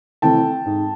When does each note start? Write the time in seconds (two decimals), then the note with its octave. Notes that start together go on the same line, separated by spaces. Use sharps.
0.22 C3 E3 A3 C4 G5 A5
0.66 G#2